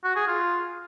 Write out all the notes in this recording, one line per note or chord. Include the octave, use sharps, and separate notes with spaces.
F#4
G#4
F4